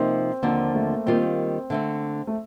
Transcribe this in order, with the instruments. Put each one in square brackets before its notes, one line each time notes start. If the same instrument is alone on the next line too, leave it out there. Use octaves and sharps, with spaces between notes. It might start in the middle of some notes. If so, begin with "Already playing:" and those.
Already playing: [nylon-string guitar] C3 F3 A#3 D#4 [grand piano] C4
[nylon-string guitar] D#2 D3 F3 C4 [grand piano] A#3
[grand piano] A3
[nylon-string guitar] D#3 G3 A#3 F4 [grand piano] C4
[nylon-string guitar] D3 A3 C4
[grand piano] A3